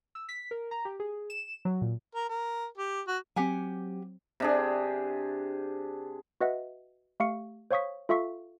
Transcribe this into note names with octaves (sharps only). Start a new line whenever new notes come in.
E6
B6
A#4
A#5
G4
G#4
E7
F#3
A#2
A#4
A#4
G4
F#4
F#3 C4 G4 F#5 G#5
C3 D4 G#4
F#4 B4 D#5 E5 F#5
A3 G4 F5 C#6 C#7
C5 C#5 F5 C#6 D#6 B6
F4 A4 E5 F5 C#6 B6